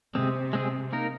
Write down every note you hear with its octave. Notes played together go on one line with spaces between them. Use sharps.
C3 G#3 C4 G#4
G#3 C4 G#4
A#3 D#4 A#4